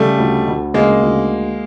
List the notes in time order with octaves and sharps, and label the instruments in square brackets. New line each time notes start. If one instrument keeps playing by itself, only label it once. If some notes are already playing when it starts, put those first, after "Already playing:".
Already playing: [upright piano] C#3 [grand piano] G3 A3
[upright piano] D2
D2
[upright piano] C#3 [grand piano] G#3 A#3
[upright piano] D2